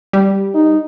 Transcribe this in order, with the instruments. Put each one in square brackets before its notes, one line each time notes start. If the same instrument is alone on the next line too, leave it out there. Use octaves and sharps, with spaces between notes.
[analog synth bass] G3
[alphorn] D#4